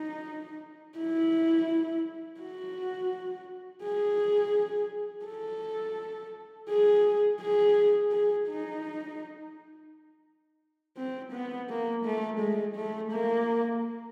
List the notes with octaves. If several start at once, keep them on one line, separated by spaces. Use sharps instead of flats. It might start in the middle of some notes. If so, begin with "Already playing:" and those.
Already playing: D#4
E4
F#4
G#4
A4
G#4
G#4
G#4
D#4
C4
B3
A#3
A3
G#3
A3
A#3